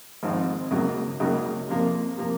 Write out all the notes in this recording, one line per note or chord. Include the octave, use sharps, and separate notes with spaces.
G#1 G#2 F3 C4 D#4
C#2 C#3 F#3 A#3 D#4
C#2 C#3 F#3 A#3 D#4
F2 C3 F3 A#3
C3 F3 A#3